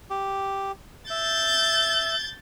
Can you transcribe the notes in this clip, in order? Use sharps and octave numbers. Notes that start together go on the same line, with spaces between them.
G4
E5 G6 A6